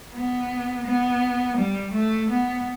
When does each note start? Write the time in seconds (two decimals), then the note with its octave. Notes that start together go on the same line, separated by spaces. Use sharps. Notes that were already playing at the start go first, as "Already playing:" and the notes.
0.14 B3
0.86 B3
1.58 G3
1.94 A3
2.30 B3